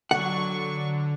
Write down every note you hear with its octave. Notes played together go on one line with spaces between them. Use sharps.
D3 F#3 F#5 C#6